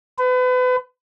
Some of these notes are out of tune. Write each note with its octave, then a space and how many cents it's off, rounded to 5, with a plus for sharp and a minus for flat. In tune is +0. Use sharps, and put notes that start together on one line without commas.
B4 +35